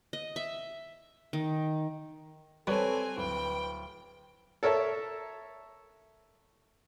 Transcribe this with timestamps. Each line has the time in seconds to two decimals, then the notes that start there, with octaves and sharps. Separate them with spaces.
0.13 D#5
0.36 E5
1.33 D#3
2.67 G3 C4 A4 B4 C#5 G#5 A5
3.17 D1 B4 G5
4.63 A4 A#4 C#5 E5 A5